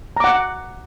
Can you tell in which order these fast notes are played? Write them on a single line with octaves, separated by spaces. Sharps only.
A#5 D6 F#5